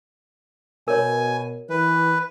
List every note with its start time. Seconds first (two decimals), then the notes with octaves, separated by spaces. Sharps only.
0.88 B2 A#4 C#5 G#5
1.70 E3 B4